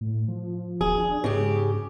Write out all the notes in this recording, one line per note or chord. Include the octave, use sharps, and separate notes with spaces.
A2
F3
D#1 G#4
D4
G#2 C#3 G4